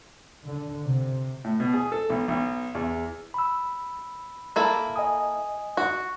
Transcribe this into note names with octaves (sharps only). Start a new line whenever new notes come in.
D3
C3
A2
B2
G#4
A4
B1
B1
E2
B5 E6
A#3 E4 A4
D#5 G#5 D#6
F#4